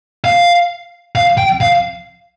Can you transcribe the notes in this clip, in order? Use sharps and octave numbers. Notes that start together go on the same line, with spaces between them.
F5
F5
G5
F5